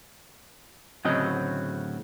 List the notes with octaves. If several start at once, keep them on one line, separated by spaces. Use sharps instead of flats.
D2 A2 C#3 F#3 C4 D#5